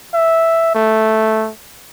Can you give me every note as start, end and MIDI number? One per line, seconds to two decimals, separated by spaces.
0.14 0.74 76
0.75 1.50 57